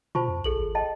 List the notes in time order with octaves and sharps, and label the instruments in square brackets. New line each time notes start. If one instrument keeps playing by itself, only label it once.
[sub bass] B2 [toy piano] F4 [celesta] C5 A5 C#6
[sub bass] F2
[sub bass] A#1 [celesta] G#4 A4 F#7
[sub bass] G#1
[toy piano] D#5 G5 A5